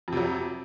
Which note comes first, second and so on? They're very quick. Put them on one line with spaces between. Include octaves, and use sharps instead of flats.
F2 C3 F#3